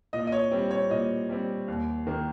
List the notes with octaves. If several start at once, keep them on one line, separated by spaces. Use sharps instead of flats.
A#2 D#5
D#5
C#5
G3 C4
C#5
A#2 D#5
G3 C4
D#2
D#3 A#3